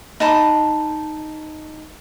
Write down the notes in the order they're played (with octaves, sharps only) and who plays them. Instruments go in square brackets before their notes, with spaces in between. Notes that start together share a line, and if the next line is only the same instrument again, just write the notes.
[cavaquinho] D#4 A5 B5